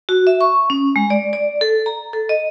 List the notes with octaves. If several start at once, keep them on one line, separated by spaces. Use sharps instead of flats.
F#4
E5
C#6
C#4
G#3
D5
D5
A4
A#5
A4
D#5